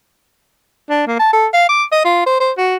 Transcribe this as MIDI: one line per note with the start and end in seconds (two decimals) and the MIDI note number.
0.90 1.05 62
1.07 1.17 58
1.19 1.31 81
1.33 1.47 69
1.54 1.67 77
1.69 1.84 86
1.92 2.04 75
2.05 2.23 65
2.26 2.40 72
2.40 2.52 72
2.58 2.76 66